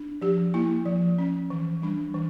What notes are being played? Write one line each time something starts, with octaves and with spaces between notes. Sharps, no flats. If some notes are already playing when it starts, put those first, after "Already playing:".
Already playing: D4
F3 G4
A#3 E4
F3
C#4
E3
G3 D4
E3